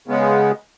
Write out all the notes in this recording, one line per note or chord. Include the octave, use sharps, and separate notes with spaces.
C#3 G#3 B3